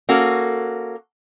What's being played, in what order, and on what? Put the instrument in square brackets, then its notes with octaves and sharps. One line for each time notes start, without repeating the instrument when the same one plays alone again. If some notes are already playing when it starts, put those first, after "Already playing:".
[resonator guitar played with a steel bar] A#3 C#4 F#4 A4